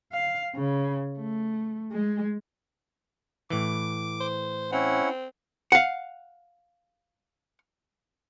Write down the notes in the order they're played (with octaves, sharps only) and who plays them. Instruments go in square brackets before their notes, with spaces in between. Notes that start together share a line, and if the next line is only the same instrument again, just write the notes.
[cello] F5
C#3
A3
G#3
[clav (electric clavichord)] A2 E3 [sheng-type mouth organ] D6
[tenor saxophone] C5
[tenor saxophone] C4 [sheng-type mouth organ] C#4 E4 F#5
[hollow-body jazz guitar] F5 F#5